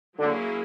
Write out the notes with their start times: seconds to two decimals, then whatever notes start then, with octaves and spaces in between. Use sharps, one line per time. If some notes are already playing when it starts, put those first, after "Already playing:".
0.19 D3 F#3 A#3 C#4 E4 G#4